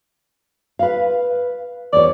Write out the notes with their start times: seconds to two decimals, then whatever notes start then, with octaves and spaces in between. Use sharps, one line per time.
0.79 B4 F5
1.93 E2 C#5 D5